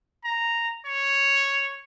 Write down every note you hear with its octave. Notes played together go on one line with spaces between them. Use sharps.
A#5
C#5